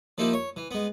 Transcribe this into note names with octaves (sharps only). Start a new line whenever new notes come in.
F3 A#3 D#4 E4 G4
C#5
E3
G#3 B3